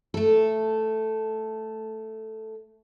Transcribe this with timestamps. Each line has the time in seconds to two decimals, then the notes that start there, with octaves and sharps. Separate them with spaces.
0.14 A3 A4